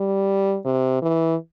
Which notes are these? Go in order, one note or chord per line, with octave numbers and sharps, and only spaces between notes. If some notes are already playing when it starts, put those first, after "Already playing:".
Already playing: G3
C3
E3